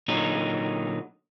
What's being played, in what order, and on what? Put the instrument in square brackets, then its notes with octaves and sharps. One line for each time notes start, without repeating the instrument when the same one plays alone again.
[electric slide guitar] A#2 D3 F#3 D#4